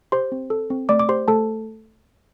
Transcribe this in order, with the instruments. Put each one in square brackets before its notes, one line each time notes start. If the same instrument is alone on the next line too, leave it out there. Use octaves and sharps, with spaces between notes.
[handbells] G4 C5 C6
C4
A4
C4
A3 D5 D6
D6
G4 C5 C6
A3 A4 A5